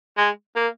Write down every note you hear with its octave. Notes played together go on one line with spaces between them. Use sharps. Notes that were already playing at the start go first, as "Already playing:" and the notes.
G#3
A#3